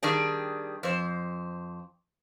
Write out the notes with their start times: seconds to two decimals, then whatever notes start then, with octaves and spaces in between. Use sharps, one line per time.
0.03 D#3 G3 D4 G#4
0.83 F2 C5